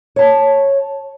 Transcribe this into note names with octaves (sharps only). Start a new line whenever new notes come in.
C#5 A5